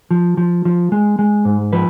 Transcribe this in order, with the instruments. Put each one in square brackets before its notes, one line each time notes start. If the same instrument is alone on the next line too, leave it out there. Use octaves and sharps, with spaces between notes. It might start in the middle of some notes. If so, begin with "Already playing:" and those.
[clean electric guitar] F3
F3
F3
G#3
G#3
G#2
F3 B4